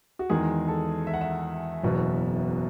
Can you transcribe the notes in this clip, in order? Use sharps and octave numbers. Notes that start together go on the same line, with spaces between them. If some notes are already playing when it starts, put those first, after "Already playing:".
F#4
E2 D#3 G#3 G#4
A4
E5
F#5
E5
F#1 E2 B2 F#3